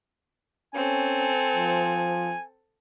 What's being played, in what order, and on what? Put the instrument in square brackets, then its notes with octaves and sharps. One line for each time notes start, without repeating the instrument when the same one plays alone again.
[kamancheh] C4 A4 [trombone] C#4 [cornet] G#5
[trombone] F3